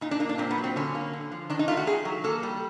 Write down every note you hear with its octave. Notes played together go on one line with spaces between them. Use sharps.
A#2 D#4
D4
A#3 D#4
D4
A#2 C4
B3
F#3
C4
D3 C#4
A#3
D3
F3
D#3 D4
D#4
A3 F4
F#4
D#3 G#4
F#3
A#3 A4
G3